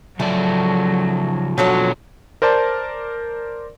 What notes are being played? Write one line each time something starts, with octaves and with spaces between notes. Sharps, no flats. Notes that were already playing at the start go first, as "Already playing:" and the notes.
C#3 F3 F#3 A3 D5
B2 F3 F#3 D4 F#4 A4 C#5
A#4 C5 D5 A5